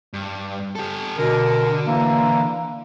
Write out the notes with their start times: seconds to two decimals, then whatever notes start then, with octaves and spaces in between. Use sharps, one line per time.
0.13 G2
0.75 G4 A4
1.18 B2 D3 A#4
1.87 E3 A#3